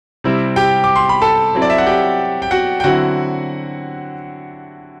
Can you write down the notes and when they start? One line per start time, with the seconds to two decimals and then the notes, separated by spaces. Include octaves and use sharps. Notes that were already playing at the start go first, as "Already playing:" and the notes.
0.24 C3 G3 C4 E4
0.56 G4 G5
0.84 D6
0.96 C6
1.09 B5
1.22 A4 A5
1.55 F#3 C4 E4
1.62 D5
1.70 E5
1.78 F#5
1.87 G4 G5
2.42 G5
2.51 F#4 F#5
2.80 G5
2.84 D3 F#3 C4 E4 F#4 F#5